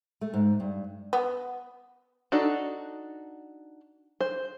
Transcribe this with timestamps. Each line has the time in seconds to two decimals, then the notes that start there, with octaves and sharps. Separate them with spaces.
0.21 A3
0.34 G#2
0.60 G2
1.13 B3
2.32 D4 D#4 F#4 A4 D5
4.20 C5